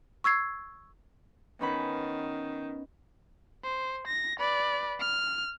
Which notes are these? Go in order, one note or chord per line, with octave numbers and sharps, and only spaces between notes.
C#6 E6 G#6 C7
D#3 B3 C#4 B5
C5
A#6
B4 D5
F6